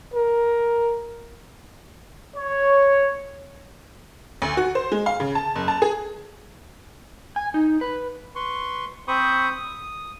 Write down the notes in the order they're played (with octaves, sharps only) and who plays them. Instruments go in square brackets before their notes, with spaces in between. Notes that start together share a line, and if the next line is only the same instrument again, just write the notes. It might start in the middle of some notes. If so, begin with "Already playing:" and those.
[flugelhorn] A#4
[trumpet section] C#5
[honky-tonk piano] D2
F#4
C5
G#3
F5
C#3
A5
F#1
A5
G#4
[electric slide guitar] G#5
D#4
B4
[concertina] B4 C6 C#6
C4 C5 B5 C#6 D#6
D#6